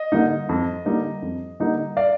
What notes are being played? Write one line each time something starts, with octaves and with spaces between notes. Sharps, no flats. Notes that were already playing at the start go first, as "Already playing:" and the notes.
Already playing: D#5
D3 G3 A#3 D#4
F2
D3 G3 A#3 D#4
F2
D3 G3 A#3 D#4
D5 F5